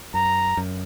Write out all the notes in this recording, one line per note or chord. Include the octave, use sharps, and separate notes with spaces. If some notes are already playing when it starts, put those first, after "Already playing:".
F#2 A#5
F#2